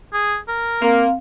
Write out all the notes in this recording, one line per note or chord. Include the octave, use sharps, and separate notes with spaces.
G#4
A#4
A#3 C4 F5